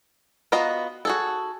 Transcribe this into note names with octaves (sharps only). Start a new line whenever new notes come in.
B3 F4 F#4 D#5 A#5
F#4 G#4 A4